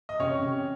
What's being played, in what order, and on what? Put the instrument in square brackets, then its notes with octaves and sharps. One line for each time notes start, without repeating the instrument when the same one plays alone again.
[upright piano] D#5
[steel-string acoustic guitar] C3 [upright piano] C#4 C#5
[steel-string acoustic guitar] C3